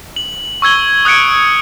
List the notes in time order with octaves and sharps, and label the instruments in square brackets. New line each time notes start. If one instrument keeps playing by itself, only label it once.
[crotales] F#7
C#6 E6 G#6 G7
D#6 F#6 G#6 C#7 D7